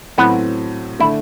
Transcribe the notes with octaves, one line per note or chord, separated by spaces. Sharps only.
A2 F#3 B3 C4 F#4
D3 A3 E4